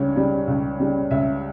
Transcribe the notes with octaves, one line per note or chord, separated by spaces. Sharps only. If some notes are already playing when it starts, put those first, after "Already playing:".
Already playing: C#2 C#3 G3 C#5
C#3 G3
C#2
C#3 G3
C#2 E5